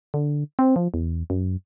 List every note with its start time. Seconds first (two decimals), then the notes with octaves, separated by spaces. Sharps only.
0.14 D3
0.59 C4
0.76 F3
0.94 E2
1.30 F#2